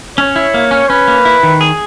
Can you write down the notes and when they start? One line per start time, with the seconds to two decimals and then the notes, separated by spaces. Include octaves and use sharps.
0.18 C#4 C#5
0.36 E4
0.54 A#3
0.71 C#4
0.89 C#4 B4
1.08 A#3
1.25 E4
1.43 D#3
1.61 G#4